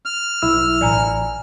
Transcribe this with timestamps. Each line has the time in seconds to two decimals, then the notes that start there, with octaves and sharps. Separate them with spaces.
0.05 F6
0.42 B1 E4 E6
0.81 A1 D5 G#5 A#5